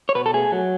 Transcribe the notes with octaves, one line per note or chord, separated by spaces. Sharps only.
C#5
B2 B4
A4
A3 G#4
F#3